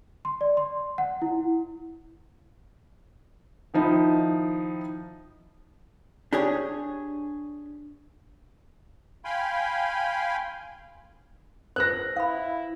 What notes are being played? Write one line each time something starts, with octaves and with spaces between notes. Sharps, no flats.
C6
D5
C6
F#5
E4
D#3 F3 D#4 E4
D4 G4 G#4 C#5
F5 G5 G#5 B5 C6
B4 C5 F#6 A#6
E4 F5 B5